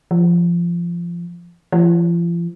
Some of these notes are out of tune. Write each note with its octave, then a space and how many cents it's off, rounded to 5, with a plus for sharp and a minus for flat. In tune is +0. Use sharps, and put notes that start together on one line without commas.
F3 -20
F3 -40